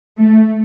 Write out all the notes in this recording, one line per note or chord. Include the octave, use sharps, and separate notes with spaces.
A3